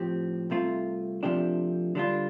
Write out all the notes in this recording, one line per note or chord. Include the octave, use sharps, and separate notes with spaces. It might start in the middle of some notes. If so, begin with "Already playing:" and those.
Already playing: A2 F3 C4 G4
C2 C3 A3 F4
C3 F3 A3 D4 G4
D3 G3 D4 F4